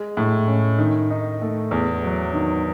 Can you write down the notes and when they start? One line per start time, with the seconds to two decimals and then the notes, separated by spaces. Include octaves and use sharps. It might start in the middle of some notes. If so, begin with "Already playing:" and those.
Already playing: G#3
0.17 A2
0.48 C#4
0.78 D#3
1.10 D#4
1.41 A3
1.71 E2
2.03 F#3
2.34 D#3